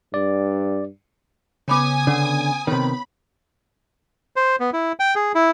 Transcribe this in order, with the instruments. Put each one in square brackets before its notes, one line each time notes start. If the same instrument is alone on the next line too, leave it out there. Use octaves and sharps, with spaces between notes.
[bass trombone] G2 [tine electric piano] D5
[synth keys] C#3 B3 [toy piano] C#5 B5 D6 [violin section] G#5 D#6
[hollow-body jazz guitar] D3 [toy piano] C#4 F#5
[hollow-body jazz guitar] C3 D#3 [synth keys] B3 [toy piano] C#5 [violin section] B5
[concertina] C5
B3
E4
G5
G#4
E4